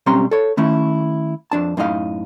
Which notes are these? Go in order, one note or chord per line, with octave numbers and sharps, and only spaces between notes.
B1 G3 C4 C#4 A#5 C6
A4 C#5
D#3 A3 C#4 E4
F2 D4 A5
F#2 A2 D#4 D#5 F5